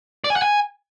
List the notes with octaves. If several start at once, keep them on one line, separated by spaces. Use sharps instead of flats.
D5
G#5
F#5
G#5